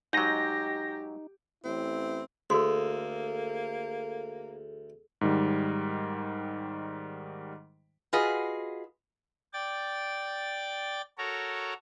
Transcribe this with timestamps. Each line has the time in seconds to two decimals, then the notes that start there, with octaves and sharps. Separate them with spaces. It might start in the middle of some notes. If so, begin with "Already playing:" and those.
0.13 G#2 F#3 D#4 G4 G6 A#6
1.64 A1 C4 E4
2.50 D2 A#3 F#4 G#4 A4 C6
5.21 G#2 D#3 G3
8.13 F4 F#4 G#4 B4 D#5
9.53 D5 G5 A6
11.18 F#4 A4 A#4 C#5 A#5